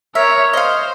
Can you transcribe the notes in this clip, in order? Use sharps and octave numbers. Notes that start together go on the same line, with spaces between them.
A#4 C#5 E5
C5 D#5 F5